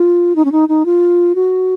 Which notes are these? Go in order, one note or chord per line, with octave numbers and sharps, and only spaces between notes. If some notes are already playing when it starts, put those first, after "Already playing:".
Already playing: F4
D#4
C#4
D#4
D#4
F4
F#4